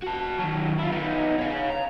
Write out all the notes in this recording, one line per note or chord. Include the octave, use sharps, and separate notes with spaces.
F#4 A5
D#3 F#3
E4 F4
B3 D#4
C#5 F5
A#5